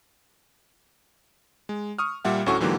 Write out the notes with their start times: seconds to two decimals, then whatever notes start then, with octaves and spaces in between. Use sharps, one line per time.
1.69 G#3
1.99 C#6 D#6 F6
2.25 A#2 G3 E5 F#5
2.46 D2 A2 C#4 F#4 A4 C#6
2.60 G#2 D3 E3 F#3 A#3 G4